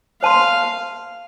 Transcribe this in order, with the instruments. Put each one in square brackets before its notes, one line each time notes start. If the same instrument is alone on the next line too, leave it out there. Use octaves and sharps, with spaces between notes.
[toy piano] C5 A5 C6 [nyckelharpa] F5